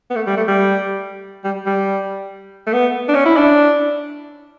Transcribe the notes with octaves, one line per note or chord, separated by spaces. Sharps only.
B3
A3
G3
A3
G3
G3
G3
A3
B3
D4
C#4
E4
D4